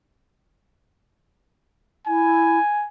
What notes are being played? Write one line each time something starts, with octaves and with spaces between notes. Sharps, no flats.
E4 G#5